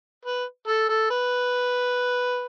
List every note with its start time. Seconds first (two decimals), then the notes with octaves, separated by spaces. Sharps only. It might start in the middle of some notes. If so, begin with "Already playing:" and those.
0.25 B4
0.67 A4
0.89 A4
1.10 B4